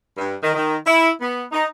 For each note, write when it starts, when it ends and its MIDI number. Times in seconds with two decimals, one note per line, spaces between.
0.17 0.34 43
0.42 0.51 51
0.54 0.75 51
0.86 1.08 64
1.21 1.43 59
1.51 1.65 63